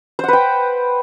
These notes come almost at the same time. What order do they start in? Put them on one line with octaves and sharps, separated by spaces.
C5 F#5 B4 G5